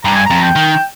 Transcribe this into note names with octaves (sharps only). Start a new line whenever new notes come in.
G2 A#5
G#5
F2 A#5
G5
D#3